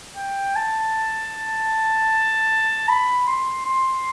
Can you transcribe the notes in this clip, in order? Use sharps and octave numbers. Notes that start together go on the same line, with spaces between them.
G5
A5
B5
C6
C6